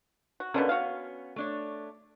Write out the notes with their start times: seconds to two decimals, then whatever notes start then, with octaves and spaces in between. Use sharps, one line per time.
0.40 F#4
0.54 B2 D3 A#3 B3 C#4
0.69 F#4 F5
1.36 A3 D4 C#5